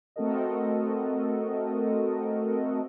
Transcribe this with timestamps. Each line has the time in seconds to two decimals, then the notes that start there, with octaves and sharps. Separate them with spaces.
0.16 A3 C4 F#4 A4 A#4 D#5